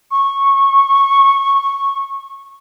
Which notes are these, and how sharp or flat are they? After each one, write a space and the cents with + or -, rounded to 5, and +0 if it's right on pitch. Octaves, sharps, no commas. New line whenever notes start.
C#6 -15